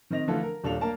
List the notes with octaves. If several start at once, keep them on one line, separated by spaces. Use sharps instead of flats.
D#3 C4 D#5 A#6 F7
D3 E3 F3 A3 F4 A4
A#4
D#1 D4 A4 F5 F7
A#3 D4 A#4 A5